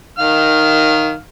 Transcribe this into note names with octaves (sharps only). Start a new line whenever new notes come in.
D#3 F5 F6